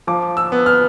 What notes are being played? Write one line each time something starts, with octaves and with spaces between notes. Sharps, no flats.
F3 D6
E6
B3
F6